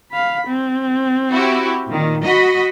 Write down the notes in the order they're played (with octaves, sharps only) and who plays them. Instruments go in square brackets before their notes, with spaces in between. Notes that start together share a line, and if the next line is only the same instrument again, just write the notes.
[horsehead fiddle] F5 B5
C4
[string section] E4 F#4 G4
A#2 D#3
F#4 D#5 B5